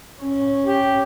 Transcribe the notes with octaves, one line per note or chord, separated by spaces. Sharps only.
C#4
G4